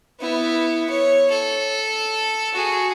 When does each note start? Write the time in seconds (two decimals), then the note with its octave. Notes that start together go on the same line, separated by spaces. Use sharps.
0.20 B3 E4
0.90 C#5
1.30 A4
2.53 F#4 G#4